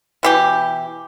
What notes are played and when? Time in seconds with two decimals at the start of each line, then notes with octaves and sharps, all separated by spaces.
0.23 B2 E3 G4